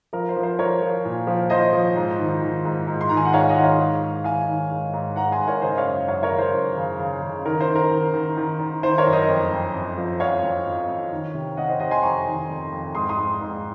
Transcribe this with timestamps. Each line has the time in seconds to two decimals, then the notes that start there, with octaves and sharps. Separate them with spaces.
0.13 F3 A#4
0.29 C5
0.36 F3
0.43 C5
0.59 F3 A#4 C#5
0.82 F3
1.05 A#2
1.27 F3
1.50 F3 C5 D#5
1.73 F3
1.96 G#2
2.19 D#3
2.42 D#3
2.65 G#2
2.87 G#2
3.01 C6
3.09 D#3 A#5
3.17 G#5
3.25 F#5
3.33 G#2 C#5 F5
3.49 D#5 F#5
3.56 D#3
3.63 C#5 F5
3.80 G#2
4.03 G#2
4.24 D#3 F5 G#5
4.48 D#3
4.71 G#2
4.93 G#2
5.16 G#2 F#5 A#5
5.32 G#5 C6
5.39 G#2
5.47 A#4 C#5
5.62 C#3 C5 D#5
5.77 C#5 F5
5.85 F#2
6.08 F#2 C#5 F5
6.23 A#4 C#5
6.31 C#3
6.38 C5
6.54 F#2
6.77 C#3
6.99 C#3
7.22 C#3
7.45 D#3 A#4
7.61 C5
7.68 D#3
7.75 A#4
7.91 D#3
8.14 D#3
8.37 D#3
8.59 D#3
8.83 D#3 C5
8.98 A#4 C#5
9.06 F#2
9.13 C5 D#5
9.29 F2
9.52 F2
9.74 F2
9.97 F3
10.20 F2 C#5 F5
10.42 F2
10.66 F2
10.88 F2
11.12 D#3
11.34 C3
11.57 C3 D#5 F#5
11.68 C5 D#5
11.80 C3 C5 D#5
11.91 G#5 C6
12.03 F2 A#5 C#6
12.26 D#3
12.49 F2
12.72 F2
12.95 G#2 C6 D#6
13.09 C6 D#6
13.17 G#2
13.41 G#2